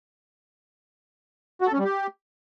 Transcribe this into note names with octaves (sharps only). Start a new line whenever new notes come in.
F#4
A4
C#4
G3
G4